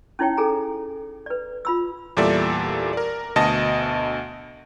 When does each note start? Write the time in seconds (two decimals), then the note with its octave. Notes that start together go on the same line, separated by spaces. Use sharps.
0.19 C#4 D#4 E4 C#5 G5
0.37 G#4 A4 G#5 A#5
1.26 B4 D5
1.65 F4 B5 E6
2.17 E2 A#2 G3 A4 D5 E5
2.93 A#4 D5
3.36 D2 B2 D#5 A5 D#6 A#6